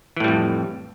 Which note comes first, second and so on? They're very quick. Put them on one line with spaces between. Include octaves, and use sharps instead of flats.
E3 A2 G3 F2